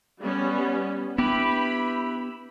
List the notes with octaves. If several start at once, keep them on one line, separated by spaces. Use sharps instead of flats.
G3 B3 C#4
B3 D4 E4 G4 B4 B5